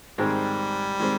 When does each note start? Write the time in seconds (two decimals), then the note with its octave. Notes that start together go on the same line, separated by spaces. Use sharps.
0.18 G#2 D#3 G3 G#3 C4
1.00 D#3 G#3 C4